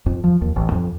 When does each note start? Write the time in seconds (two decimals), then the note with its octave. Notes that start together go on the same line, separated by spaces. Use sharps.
0.06 F2
0.24 F3
0.42 D#2
0.56 A1
0.72 F2